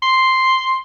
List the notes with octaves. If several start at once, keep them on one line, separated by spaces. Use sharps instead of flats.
C6